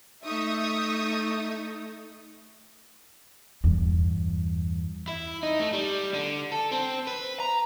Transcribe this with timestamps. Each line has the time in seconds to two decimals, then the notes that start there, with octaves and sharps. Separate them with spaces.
0.25 A3 D#4 E5 C#6 D#6
3.64 E2 G2
5.08 E4
5.43 D#4
5.59 A3
5.73 G3
6.14 D3
6.52 A4
6.72 C4
7.08 B4
7.40 A#5